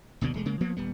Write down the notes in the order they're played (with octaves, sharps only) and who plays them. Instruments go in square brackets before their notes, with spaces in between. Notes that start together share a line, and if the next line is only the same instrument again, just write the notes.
[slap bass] G1 D#2 B2 D3
E1 G#3 A3
C#3 G#3 A#3
F3 A#3 B3
D#1 G3 B3